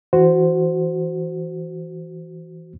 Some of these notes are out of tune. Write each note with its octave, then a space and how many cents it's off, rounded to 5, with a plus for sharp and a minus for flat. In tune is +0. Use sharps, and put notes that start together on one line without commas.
E3 -5 F#4 +0 C5 -10